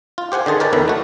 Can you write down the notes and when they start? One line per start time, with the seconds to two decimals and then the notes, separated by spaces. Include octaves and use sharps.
0.18 F4
0.32 G4 C5 F#5 G#5
0.46 D3 D#3 G#4 A5
0.60 A#4 B4 C#5 D5 G5 A5
0.73 E2 D3 D#3 B4 E5
0.88 A3 F#4